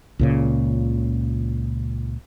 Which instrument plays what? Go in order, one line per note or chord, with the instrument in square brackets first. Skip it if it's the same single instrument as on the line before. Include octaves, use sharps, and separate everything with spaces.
[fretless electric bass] C#2 A#2 C#3